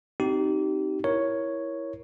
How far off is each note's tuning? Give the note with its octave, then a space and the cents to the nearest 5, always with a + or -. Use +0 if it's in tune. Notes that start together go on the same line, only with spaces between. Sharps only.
C4 +10 D#4 +0 G4 -30
E4 +0 A#4 +10 C#5 +0